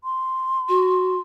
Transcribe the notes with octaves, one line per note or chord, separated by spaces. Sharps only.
C6
F#4